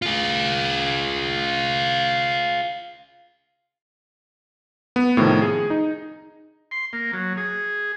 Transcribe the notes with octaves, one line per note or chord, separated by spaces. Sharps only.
F4 G#4
B3
A2 C3 D#3 F3
G#4
D#4
C6
A#3
F#3
G#4